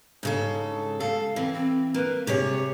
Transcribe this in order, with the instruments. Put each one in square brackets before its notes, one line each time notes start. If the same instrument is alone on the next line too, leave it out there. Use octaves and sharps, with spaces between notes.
[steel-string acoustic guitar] G#2 C#3 A4
[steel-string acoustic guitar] A4 [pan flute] F5
[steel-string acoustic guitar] E3 [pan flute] C4
[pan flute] C4
[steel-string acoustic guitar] A#3 [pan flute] B4
[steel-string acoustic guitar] C3 G#4 C#5 [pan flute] G4